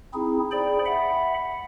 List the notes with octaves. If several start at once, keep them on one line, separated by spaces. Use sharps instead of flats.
C4 D#4 E4 G#4
G#4 C5 D5 G5 B5
E5 F#5 B5